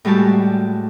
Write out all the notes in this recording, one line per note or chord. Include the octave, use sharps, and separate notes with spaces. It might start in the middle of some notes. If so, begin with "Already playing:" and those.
A2 G3 G#3 F#4 G4 A5